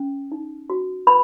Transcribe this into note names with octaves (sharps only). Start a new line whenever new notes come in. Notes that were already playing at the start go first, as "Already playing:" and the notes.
Already playing: C#4
D#4
F#4
B4 B5